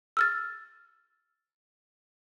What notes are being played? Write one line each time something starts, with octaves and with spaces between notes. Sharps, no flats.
E6 F6 A6